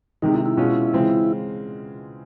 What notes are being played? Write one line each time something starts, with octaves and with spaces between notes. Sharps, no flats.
C3 D#3 G#3 D#4
E4
E4
B2 G#3 C#4 F4
C#3 E3 G#3 C4 F4